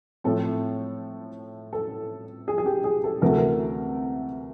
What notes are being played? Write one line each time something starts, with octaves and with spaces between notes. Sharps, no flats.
A2 F3 A3 C4 A4
A4
G#4
G#4
G4
G#4
A4
D2 C3 E3 A3 A#4
A4
A#4